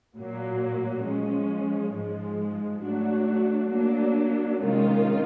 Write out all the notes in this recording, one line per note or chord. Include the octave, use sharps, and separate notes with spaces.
A#2 F#3 A#3
F3 G#3 C#4
G#2 F3 G#3
F#3 A3 D4 F#4
F#3 A#3 D4
C3 D#3 G#3 C#4 F4